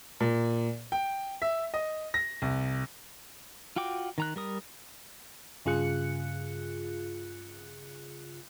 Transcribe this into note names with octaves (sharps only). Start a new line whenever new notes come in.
A#2
G5
E5
D#5
A#6
C2
F4 F#4 G5 D6
D#3 A#5 F#6
G3 A#4 D#6
G2 C#3 F4 G#4 F#6 C#7